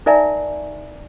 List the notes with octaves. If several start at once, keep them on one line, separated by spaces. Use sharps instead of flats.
D#4 A#4 D5 E5 G#5 A#5